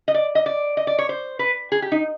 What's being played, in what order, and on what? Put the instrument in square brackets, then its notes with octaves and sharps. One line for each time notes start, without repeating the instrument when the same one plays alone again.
[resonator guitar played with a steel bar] D#5
D5
D#5
D5
D#5
D5
C#5
C5
B4
G#4
G4
D#4